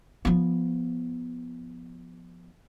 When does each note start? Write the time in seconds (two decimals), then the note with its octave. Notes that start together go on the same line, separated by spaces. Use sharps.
0.25 F3 B3